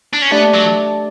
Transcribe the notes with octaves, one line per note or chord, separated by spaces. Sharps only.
D4
C#4
A3 B3 D4 G4 D5 A5
F#3